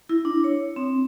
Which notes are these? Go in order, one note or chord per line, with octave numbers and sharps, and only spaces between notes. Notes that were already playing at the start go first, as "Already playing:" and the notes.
E4
D4
C#5
C4